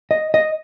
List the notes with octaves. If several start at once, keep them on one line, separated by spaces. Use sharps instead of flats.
D#5
D#5